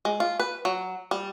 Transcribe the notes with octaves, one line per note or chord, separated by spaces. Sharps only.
G#3
F4
B4
F#3
G3